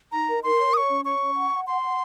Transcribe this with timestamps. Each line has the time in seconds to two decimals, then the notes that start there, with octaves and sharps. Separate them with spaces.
0.12 D#4 A#5
0.28 A#4
0.43 A#4 C6
0.59 C#5
0.74 C#5 C#6 D#6
0.90 C#4
1.05 C#5 C#6
1.20 C#4
1.35 F#5
1.51 F#5
1.67 F#5 C6
1.82 F#5